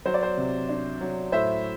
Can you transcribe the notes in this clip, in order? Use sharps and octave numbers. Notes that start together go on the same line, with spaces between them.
F#3 C5
D5
C5
C3
D4
F#3
A2 C5 E5